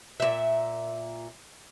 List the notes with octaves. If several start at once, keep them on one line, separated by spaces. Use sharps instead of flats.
A#2 E5